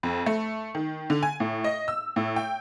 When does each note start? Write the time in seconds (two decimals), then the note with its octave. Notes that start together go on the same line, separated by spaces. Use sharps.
0.03 F2
0.26 A3
0.75 D#3
1.10 D3
1.23 G#5
1.40 A2
1.64 D#5
1.88 E6
2.16 A2
2.36 G5